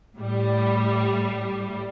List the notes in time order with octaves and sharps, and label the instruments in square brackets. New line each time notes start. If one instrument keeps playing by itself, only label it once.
[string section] A2 G3